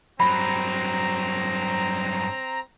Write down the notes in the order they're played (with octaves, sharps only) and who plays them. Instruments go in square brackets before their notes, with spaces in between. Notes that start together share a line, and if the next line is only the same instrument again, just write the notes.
[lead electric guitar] G2 F#3 [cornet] C4 [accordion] A#5 [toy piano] B5